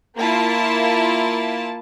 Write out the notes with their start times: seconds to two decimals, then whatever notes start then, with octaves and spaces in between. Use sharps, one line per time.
0.18 A#3 E4 F4 A5